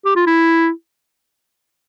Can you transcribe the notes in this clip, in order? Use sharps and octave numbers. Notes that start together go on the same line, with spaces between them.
G4
F4
E4